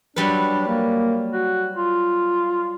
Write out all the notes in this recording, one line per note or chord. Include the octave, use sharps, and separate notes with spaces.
F#3 G3 D4 B4
A#3
F#4
F4